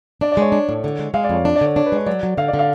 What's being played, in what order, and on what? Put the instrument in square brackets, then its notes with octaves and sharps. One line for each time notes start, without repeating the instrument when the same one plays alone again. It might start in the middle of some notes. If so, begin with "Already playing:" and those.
[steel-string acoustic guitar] D4 [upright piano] D5
[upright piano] D5
[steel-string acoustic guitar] G#3 [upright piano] C#5
[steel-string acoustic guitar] D4
A2
D3
G#3
[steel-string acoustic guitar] G#3 [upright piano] F5
[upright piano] D5
[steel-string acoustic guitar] F2
[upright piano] C#5
[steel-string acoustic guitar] D4 [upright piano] D5
[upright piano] D5
[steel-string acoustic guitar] D3 [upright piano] C#5
[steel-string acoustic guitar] D4 [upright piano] C#5
[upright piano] B4
[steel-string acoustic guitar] G#3 [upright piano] C#5
[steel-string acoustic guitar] F#3 [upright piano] D5
[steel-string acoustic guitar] F#3
[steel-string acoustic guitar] D3 [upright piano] F5
[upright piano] D5
[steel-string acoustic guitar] D3
[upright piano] F5